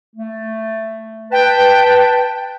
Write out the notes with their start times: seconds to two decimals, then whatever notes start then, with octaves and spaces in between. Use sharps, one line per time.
0.16 A3
1.32 B4 G5 A5